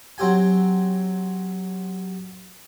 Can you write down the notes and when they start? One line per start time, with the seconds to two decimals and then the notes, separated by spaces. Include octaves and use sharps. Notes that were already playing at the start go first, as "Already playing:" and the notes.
0.18 F#3 C4 G4 G#5